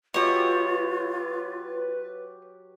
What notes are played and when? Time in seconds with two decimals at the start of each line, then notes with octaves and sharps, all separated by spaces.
0.14 F#3 F4 G4 B4 C#5 D#5 E5